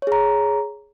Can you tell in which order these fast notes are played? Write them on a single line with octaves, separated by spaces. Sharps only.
C#5 G#4 A#5